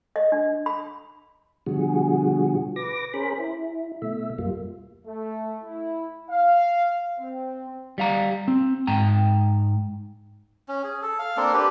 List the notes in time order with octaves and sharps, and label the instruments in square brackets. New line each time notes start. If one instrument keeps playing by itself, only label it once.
[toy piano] D#5
D4
B5
[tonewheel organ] B2 D3 F3 G3 F#4 G#4
B4 D6 A#6
C#4 G#4 A#4 C5 B5
E4
B2 A3 E5
F#2 G3 A#3 F4
[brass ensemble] A3
E4
F5
C4
[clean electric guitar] G3 F5 A#5
C4
G#2 G5 A#5
[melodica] C#4
G#4
A4
F5
A#3 C4 D4 A4
D4 G4 B4